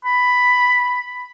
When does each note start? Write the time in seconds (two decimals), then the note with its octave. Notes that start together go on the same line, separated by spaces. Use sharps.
0.05 B5